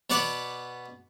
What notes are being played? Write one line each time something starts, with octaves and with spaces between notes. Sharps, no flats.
B2 B3 D5 F#5 D6